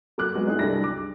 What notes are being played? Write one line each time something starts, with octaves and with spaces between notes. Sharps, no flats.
F#3 A#3 D6 F#6
F#3 G#3 B3
D#4 E4 G#4
C2 D4 A#6
D6